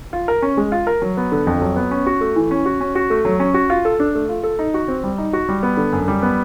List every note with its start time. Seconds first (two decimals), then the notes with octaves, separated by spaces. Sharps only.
0.13 F4
0.28 A#4
0.42 C#4
0.57 G#3
0.72 F4
0.87 A#4
1.02 F#3
1.17 B3
1.32 D3
1.47 F2
1.61 F#3
1.76 B3
1.91 C#4
2.06 F#4
2.21 A3
2.36 E3
2.51 C#4
2.66 F#4
2.81 C#4
2.95 F#4
3.10 A3
3.25 F#3
3.40 C#4
3.54 F#4
3.70 F4
3.85 A4
4.00 D4
4.15 A3
4.29 F4
4.43 A4
4.59 D#4
4.74 F#4
4.88 C4
5.04 G3
5.18 D#4
5.33 F#4
5.49 G3
5.63 B3
5.77 D3
5.93 F#2
6.08 G3
6.22 B3